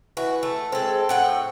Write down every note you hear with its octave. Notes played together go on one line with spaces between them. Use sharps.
E3 F#4
A3
G#3 C4 A4
A2 F#5 G5